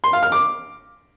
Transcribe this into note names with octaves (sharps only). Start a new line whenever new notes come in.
C6
F5
F6
D6